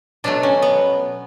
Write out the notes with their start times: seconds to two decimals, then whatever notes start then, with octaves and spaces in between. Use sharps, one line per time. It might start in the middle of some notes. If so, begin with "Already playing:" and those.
0.24 B2 F#3 A3 D4
0.43 C#4
0.62 B3